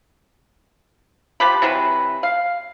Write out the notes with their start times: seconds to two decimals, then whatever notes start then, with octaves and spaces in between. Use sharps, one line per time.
1.40 F3 G4 B4
1.62 C3 E3 F#3 B4
2.23 F5